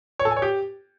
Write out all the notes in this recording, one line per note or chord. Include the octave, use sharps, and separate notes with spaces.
C#5
A4
G#5
C#5
G4